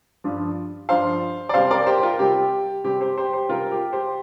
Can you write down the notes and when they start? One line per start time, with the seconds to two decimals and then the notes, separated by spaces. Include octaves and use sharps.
0.24 G2 F3 D4 F4
0.89 G2 F3 D4 F4 C5 F5
1.49 D5
1.54 C3 G3 C4 C5 F5
1.71 A#4 D5
1.86 G4 C5
1.98 G4
2.03 F4 A#4
2.19 C3 G3 C4 G4
2.84 C3 G3 C4 G4
3.01 G4 C5
3.18 G4 C5
3.33 G4 C5
3.49 C3 G3 C4 F4 A#4
3.71 G4
3.93 G4 C5